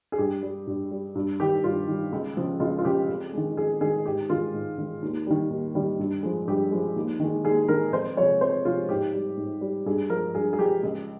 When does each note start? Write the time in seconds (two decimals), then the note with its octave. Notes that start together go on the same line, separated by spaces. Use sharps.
0.12 G#4
0.18 G2 G4
0.43 G3
0.67 G2
0.91 G3
1.15 G2
1.40 D#3 G3 G4
1.64 G2 F4
1.88 D#3 G3
2.12 C#2
2.37 C#3 F3
2.60 C#2 F4
2.78 F4
2.85 C#3 F3 G4
3.09 F2
3.33 D#3 G#3
3.57 F2 G#4
3.81 D#3 G#3 G#4
4.05 G#2 G4
4.30 D#3 G#3 F4
4.54 G#2
4.78 D#3 G#3
5.02 D#2
5.27 D#3 G3
5.50 D#2
5.75 D#3 G3
5.99 G2
6.23 F3 G#3
6.48 G2 G4
6.71 F3 G#3
6.96 D#2
7.20 D#3 G#3
7.44 D#2 G#4
7.68 D#3 G#3 A#4
7.92 F2 C5
8.17 C3 F3 G#3 C#5
8.41 F2 C5
8.65 C3 F3 G#3 F4
8.89 G#2 G4
9.14 G3
9.37 G#2
9.61 G3
9.86 G2 G#4
10.10 F3 G#3 A#4
10.35 G2 G#4
10.53 G#4
10.59 F3 G#3 G4
10.83 C#2